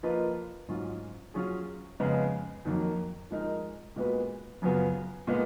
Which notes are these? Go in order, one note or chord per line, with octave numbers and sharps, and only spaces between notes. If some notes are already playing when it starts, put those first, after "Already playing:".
F3 A#3 F4 B4 D#5
G#2 F#3 C#4 F4
F#3 C#4 F4 G#4
F2 C#3 G#3 B3
F2 D#3 F#3 A#3
F3 G#3 D#4 A#4
A#2 G#3 B3 F#4 B4
F#2 C#3 F#3 B3 F4
A#2 G#3 B3